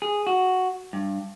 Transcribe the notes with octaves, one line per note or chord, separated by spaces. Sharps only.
G#4
F#4
G2